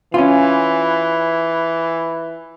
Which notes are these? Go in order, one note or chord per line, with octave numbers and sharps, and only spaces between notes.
E3 C#4 F4